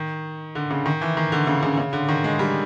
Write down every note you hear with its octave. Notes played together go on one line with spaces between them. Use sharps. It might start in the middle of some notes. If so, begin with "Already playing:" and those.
Already playing: D#3
D3
C#3
D#3
E3
D#3
D3
C#3
C#3
C#3
D3
D#3
G#3
G3